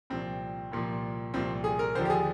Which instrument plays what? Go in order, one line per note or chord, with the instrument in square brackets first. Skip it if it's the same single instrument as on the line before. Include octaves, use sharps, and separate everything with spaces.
[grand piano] C2 A#2 F3 C4
C2 A#2 F3
C2 A#2 F3 C4
G#4
A#4
D#2 D3 F3 C5
G4
G#4